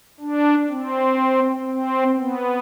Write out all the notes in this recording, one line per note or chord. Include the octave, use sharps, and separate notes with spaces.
D4
C4
C4
B3